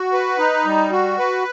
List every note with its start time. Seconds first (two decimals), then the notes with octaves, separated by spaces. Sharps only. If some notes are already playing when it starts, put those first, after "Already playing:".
Already playing: F#4
0.13 B4
0.38 D#4
0.65 G3
0.91 F#4
1.19 B4